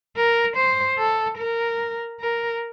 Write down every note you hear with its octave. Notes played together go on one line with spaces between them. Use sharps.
A#4
C5
A4
A#4
A#4